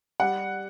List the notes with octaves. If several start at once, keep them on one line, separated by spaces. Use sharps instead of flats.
G3 F#5